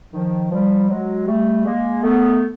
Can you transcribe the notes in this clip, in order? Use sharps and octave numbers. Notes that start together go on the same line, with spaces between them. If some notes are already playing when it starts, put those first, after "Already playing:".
D#3 F3
F3 G3
F#3 G#3
G3 A3
G#3 A#3
A3 B3